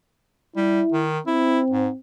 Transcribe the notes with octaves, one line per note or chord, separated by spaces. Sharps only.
G3 E4
D#3
C4 E4
G#2